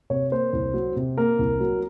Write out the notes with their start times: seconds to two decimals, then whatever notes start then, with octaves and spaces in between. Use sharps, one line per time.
0.10 C3 C#5
0.31 A#3 C5
0.53 C2
0.74 F#3
0.96 C3
1.18 A#3 A#4
1.39 C2
1.60 F#3